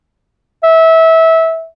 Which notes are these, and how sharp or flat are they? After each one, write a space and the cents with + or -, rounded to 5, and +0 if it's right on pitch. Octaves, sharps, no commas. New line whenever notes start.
E5 -20